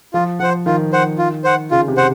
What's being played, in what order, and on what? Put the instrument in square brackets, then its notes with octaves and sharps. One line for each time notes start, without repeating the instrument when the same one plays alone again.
[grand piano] F3 [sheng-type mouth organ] F4
[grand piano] F3 [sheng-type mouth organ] C5 F#5
[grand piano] D#3 [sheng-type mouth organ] F4
[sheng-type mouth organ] C5 F#5
F4
C5 F#5
[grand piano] C#3 [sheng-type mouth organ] F4
[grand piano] C3
[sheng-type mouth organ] C5 F#5